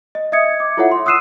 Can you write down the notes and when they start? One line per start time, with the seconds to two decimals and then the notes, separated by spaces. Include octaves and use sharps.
0.15 D#5
0.32 D#5 E5 D#6 G#6 C#7
0.60 D6
0.77 E4 F4 A4 C#5 E5 F#5
0.91 C6
1.06 D#6 E6 F#6 C7 D#7 E7